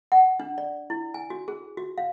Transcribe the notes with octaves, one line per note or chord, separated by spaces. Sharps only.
F#5
D4
D5
E4
G#5
F#4
G#4
F#4
F5